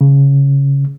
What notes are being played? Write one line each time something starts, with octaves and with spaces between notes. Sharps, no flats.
C#3